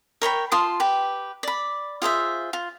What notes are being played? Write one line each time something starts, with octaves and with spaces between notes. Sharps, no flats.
A#4 C#5 G5 B5
F4 A5 C6 D#6
G4 B4
D5 B5
F4 G#4 C5 E5
F4